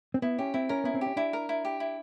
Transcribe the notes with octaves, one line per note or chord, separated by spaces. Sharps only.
C4
B3 E4
C#4 G4
C4 E4
C#4 A#4
B3 E4
C4
G4
C#4
D4 E4
A#4
E4
G4
E4